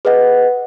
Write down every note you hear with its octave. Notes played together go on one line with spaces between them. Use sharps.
G#4 B4 D#5 F#5